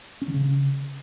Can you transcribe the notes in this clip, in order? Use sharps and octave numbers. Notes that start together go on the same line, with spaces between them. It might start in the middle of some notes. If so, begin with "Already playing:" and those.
C#4
D#3
C#3